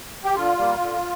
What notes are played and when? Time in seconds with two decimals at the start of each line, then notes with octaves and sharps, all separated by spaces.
0.25 G4
0.35 D3 F4
0.57 G3 A#3
0.80 D3